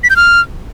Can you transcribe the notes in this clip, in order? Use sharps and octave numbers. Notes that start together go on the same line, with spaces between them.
B6
G6
F6